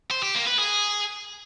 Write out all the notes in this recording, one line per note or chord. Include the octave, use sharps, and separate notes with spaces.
C5
G4
A#3
B4
G#4